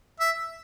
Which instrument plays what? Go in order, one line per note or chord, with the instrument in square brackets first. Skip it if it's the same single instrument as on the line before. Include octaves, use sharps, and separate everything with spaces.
[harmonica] E5